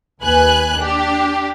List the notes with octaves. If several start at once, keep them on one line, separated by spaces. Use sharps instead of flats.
D#2 B4 G#5 F#6
D4 G4